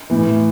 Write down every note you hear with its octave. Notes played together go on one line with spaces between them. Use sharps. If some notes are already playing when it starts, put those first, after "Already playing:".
A2 E3